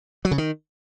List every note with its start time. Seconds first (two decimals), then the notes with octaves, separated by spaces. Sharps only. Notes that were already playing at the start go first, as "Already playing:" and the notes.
0.25 F#3
0.31 C#3
0.38 D#3